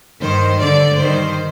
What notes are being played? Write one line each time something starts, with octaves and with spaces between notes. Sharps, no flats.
G2 D#3 C5
G2 D3 D5
G2 D#3 C5